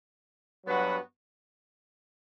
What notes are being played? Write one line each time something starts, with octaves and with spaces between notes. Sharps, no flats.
G2 F#3 B3 F#4 B4